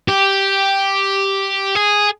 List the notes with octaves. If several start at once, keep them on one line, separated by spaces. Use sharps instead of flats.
G4
G#4